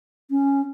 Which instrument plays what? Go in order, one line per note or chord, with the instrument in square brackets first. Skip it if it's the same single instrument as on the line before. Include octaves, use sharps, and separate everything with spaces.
[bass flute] C#4